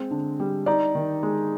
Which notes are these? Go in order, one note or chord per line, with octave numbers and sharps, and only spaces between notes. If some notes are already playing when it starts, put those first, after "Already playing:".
Already playing: G#3 C4
D3
G3
D#4 D5
D#3
G#3